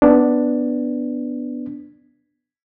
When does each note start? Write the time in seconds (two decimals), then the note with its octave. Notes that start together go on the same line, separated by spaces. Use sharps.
0.02 B3 D4